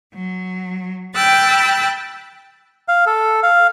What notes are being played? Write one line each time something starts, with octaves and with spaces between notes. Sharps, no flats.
F#3
G5 B5 E6 F#6 A6
F5
A4
F5